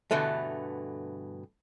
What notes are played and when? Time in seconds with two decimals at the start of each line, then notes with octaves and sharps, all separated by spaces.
0.11 G2 B2 D3 E3 A3